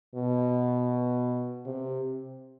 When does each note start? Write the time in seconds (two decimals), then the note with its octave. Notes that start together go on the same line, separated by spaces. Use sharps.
0.15 B2
1.66 C3